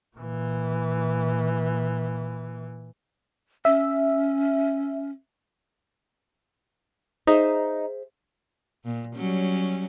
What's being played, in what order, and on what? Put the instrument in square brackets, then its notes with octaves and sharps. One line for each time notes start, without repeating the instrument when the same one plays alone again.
[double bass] A#2 E3
[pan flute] C#4 [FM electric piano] E5
[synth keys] D#4 [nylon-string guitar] G#4 C5 E5
[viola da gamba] A#2
F#3 G3 C#4